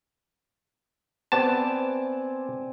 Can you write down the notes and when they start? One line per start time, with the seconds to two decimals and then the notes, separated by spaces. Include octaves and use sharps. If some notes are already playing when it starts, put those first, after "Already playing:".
1.32 B3 C4 D5 G#5 A5